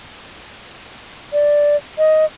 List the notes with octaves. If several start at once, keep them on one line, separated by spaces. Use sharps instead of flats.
D5
D#5